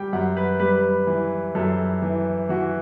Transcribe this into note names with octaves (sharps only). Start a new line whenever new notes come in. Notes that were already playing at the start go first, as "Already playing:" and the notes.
Already playing: G3 G5
F#2 F#5
B4
G3 B4
E3
F#2 A4
E3
E3 F#4